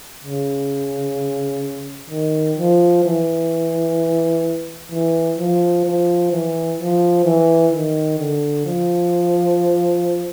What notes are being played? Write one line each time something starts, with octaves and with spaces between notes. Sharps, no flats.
C#3
D#3
F3
E3
E3
F3
F3
E3
F3
E3
D#3
D3
F3